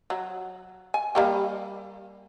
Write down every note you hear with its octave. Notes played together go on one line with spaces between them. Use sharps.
F#3
G#5
G3 A#3 G4